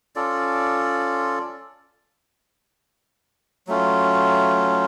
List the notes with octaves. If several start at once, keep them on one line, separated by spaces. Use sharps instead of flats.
C#4 F4 A4 D5
F#3 A3 C#4 F4